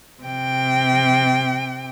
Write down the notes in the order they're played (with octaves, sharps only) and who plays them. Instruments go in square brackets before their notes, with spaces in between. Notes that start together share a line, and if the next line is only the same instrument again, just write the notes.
[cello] C3 G5